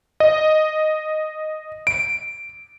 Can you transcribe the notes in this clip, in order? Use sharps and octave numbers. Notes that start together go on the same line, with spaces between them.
D#5
D7